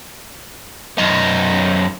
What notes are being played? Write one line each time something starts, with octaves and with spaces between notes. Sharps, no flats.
F#2 D#4